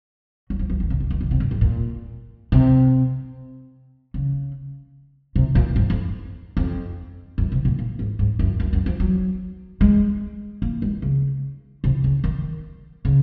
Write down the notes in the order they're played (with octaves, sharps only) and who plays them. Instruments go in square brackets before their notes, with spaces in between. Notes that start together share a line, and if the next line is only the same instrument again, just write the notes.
[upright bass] F#3
F3
F3
D#3
C#3
D#3
D#3
C#3
C3
F#2
G#2
A#2
C3
C#3
C3
A#2
G#2
F2
F2
F#2
C3
A#2
A#2
G#2
G#2
F#2
F#2
F#2
F3
F#3
G#3
A#3
G#3
C#3
C3
C#3
D#3
C#3